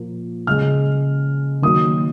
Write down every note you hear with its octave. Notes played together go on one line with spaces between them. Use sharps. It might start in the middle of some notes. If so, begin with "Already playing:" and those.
Already playing: A#2 F3 A#3
C#3 G#3 F6
D#3 F#3 A#3 D#6